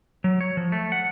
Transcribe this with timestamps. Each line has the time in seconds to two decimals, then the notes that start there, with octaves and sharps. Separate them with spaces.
0.24 F#3
0.41 C#5
0.57 F3
0.72 A3
0.92 F#5